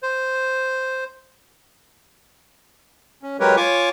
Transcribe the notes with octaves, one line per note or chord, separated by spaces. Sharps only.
C5
C#4
F#3 G#3 G4 A#4 B4 C#5
F4 C#5 G#5 C#6 D6